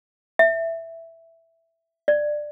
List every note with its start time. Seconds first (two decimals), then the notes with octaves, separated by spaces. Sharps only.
0.39 E5
2.08 D5